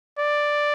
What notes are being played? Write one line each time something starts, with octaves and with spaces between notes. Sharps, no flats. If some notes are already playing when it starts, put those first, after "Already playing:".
D5